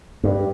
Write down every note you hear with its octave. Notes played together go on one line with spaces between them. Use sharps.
G2